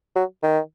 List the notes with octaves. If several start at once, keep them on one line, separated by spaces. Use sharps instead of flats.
F#3
D#3